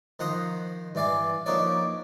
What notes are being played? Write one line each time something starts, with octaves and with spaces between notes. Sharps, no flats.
D#3 F3 F#5 A#5 C6 D#6
G2 E3 D5 F5 G#5
F3 A#3 D4 D#4 C#5 D5